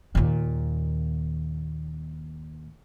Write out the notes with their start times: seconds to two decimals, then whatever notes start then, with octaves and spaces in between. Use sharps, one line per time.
0.15 D#2 A#2